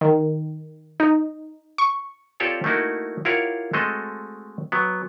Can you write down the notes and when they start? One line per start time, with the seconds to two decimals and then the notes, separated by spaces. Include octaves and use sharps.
0.01 D#3
1.00 D#4
1.78 C#6
2.40 C4 F4 G4 A4 C#5 D5
2.64 A3 A#3 D#4 E4 F#4
3.25 E4 F4 G4 A#4 C#5 F#5
3.73 G#3 A3 C4 F#4 A4 D#5
4.72 F#3 B3